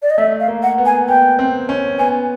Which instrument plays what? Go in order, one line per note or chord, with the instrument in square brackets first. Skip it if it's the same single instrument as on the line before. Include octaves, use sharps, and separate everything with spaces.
[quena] D5
D#5
[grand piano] A3 [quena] E5
[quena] F5
[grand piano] A#3
[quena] F#5
[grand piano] B3
[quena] G#5
[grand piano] B3 [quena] G5
[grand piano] C4
C#4
[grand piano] B3 [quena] G#5